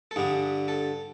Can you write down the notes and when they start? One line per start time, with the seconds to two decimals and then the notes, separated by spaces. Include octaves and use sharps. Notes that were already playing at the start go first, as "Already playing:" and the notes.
0.11 A4
0.16 G2 D3 G3 G#4
0.68 A4